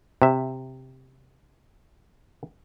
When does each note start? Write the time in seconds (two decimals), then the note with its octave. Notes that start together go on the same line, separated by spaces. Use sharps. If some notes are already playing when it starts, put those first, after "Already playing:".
0.22 C3 E5